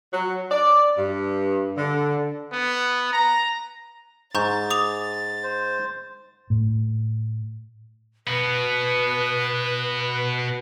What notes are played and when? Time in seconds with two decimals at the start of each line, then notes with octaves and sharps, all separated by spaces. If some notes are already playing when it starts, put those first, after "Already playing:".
0.13 F#3
0.51 D5
0.97 G2
1.77 D3
2.53 B3
3.12 A#5
4.35 G#2 A#5 C#6 G6 A6
4.70 D6 D#6 F7
5.43 C5
6.50 A2
8.27 B2 B3 B4